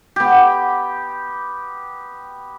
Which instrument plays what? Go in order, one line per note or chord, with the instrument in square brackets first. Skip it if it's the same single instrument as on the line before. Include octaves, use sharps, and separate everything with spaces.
[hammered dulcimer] B3 G4